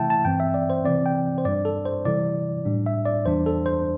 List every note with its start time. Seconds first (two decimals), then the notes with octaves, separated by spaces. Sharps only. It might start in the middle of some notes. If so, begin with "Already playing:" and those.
Already playing: C3 E3 A3 E4 E5 G5 A5
0.10 A5
0.25 G2 E3 C4 G5
0.40 E5
0.54 D5
0.70 C5
0.85 C3 E3 C4 D5
1.06 G5
1.38 C5
1.45 G2 G3 D4 D5
1.65 A4
1.85 C5
2.05 C3 E3 G3 E4 D5
2.65 A2 G3 D4
2.86 E5
3.05 D5
3.26 E2 E3 G3 D4 C5
3.46 A4
3.66 C5